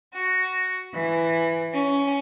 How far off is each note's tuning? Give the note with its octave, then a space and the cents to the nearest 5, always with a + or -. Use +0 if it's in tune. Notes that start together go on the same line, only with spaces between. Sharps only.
F#4 +5
E3 +10
C#4 +15